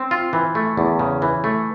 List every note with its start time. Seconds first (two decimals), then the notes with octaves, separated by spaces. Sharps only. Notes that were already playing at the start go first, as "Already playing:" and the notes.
Already playing: C4
0.11 F4
0.33 E3
0.55 A3
0.77 E2
0.99 C#3
1.22 E3
1.44 A3